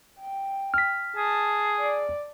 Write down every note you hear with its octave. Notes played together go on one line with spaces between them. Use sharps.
G5
F6 B6
G#4 A5
D5